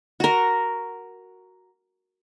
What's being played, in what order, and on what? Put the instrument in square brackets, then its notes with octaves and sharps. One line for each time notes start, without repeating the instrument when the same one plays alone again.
[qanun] F#4 A#4